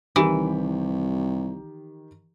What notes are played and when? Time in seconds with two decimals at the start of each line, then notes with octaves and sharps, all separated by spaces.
0.16 C2 D#3 E3 G4